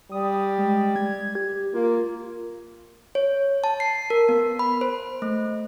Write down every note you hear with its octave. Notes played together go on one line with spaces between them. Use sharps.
G3 D#6
G#3
G#6
G4
A#3 F4
C#5
A5
C7
A#4
B3
B5
C5
A3